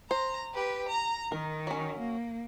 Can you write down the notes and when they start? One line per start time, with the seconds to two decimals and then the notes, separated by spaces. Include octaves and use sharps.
0.11 C5 A#5
0.54 G4 B4
0.88 A#5
1.32 D#3 A#4
1.67 F#3 C#4
1.99 A#3